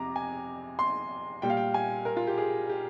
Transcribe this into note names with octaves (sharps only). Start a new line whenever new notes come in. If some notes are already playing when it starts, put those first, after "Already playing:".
Already playing: F2 C3 A#5 D6
G#5
C6
A#2 G3 G5
F5
G5
G#5
A#4
F4
G4
G#4
G4